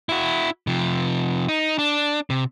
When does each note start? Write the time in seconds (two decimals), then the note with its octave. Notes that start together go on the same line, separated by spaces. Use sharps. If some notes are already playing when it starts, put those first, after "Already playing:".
0.09 E4 F#4
0.67 C3 F3
1.49 D#4
1.78 D4
2.30 C3